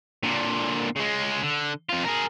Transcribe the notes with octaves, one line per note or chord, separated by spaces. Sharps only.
A#2 D3
C#3 G#3
D3
F2 F4
G#4 A#4